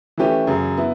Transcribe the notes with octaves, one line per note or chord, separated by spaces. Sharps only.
E3 A3 C#4 G4 B4
F#2 C#3 F#3
B3 E4